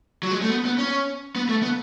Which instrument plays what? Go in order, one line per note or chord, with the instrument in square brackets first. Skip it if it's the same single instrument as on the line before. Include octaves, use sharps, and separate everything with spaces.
[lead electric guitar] F#3
G#3
A3
B3
B3
C#4
B3
A3
B3